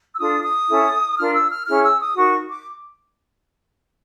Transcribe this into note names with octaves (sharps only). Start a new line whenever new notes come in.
E6
D4 F4 A4 D#6
D#6
C#4 E4 A4
D4 F4 A#4 F6
E6
F6
C#4 E4 G#4 F6
E6
D#6
D#4 F#4 A#4 C#6
D6